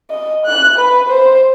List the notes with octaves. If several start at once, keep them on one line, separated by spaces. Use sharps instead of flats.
D#5
F#6
B4
C5